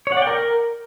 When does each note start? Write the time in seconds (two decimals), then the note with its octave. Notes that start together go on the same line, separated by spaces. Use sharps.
0.07 C#5
0.12 F#5
0.17 D5
0.22 G5
0.27 A#4